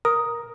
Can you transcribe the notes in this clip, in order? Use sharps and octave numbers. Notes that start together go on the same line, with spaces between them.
A#4 D#6